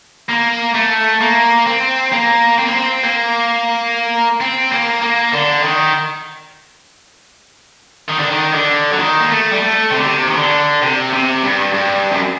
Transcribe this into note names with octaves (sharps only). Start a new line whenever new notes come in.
A#3
A3
A#3
C4
A#3
C4
A#3
C4
A#3
C4
A#3
A#3
D3
D#3
D#3
D3
D#3
D3
F#3
D#3
A#3
A3
G3
A3
C3
D3
C3
D#3
D3
C3
C3
G2
G2
F#2